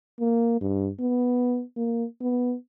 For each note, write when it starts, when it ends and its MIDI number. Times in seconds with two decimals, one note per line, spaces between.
0.20 0.57 58
0.61 0.90 43
1.00 1.63 59
1.77 2.05 58
2.21 2.54 59